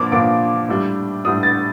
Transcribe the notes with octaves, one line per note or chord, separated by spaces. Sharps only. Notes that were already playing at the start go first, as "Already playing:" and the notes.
Already playing: A#2 F3 A#3 D4 D6
A#2 F3 A#3 D4 D6
A2 G3 D4
A2 G3 D4 D#6
A6